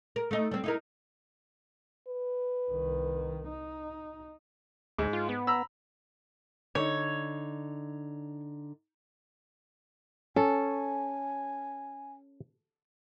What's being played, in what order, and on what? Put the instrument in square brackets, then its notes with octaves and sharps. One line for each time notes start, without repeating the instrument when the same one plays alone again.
[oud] A#4
A3 D#4
G3 C4
D#4 E4 A#4
[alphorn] B4
[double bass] C2 D#3
D#4
[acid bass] D2 [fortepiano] G#2
[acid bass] F4
B3
[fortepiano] A#5 B5 E6
[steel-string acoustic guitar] D3 D#4 [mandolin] C#5
[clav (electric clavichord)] C#4 [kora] A4 [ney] G#5